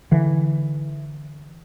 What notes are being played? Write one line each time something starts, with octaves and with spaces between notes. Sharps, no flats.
D3 E3